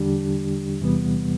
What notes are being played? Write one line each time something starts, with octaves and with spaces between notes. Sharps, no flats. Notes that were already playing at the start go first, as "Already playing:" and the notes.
Already playing: E2 D3 G3 D4 G4
E2 C3 E3 G3 B3